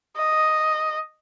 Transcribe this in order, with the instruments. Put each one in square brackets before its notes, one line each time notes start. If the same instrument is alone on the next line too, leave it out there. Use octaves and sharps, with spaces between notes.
[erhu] D#5